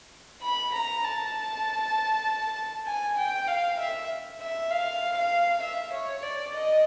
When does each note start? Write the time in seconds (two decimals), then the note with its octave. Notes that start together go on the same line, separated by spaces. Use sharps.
0.42 B5
0.74 A#5
1.04 A5
2.87 G#5
3.18 G5
3.48 F5
3.79 E5
4.40 E5
4.71 F5
5.17 F5
5.62 E5
5.92 C#5
6.23 D5
6.54 D#5